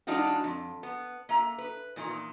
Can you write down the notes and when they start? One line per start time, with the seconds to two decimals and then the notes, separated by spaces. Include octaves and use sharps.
0.07 E3 G#3 D4 D#4 F4 F#4
0.44 F2
0.83 B3
1.29 A#3 E5 A#5
1.58 B4
1.96 E2 A#2 D#3